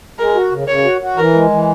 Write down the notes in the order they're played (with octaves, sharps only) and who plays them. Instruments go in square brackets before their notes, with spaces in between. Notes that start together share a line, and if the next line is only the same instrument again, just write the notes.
[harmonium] G#3 [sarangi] A#4
[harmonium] F#4
C#3
[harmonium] C#3 [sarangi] C#5
[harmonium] F#4
F#4
[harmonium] E3 [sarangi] A#4
[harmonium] G#3
E3